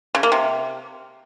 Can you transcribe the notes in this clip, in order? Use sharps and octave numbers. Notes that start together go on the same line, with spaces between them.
C#3
A#3
C3